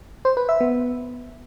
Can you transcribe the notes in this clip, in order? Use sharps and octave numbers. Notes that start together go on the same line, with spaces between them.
C5
B4
E5
B3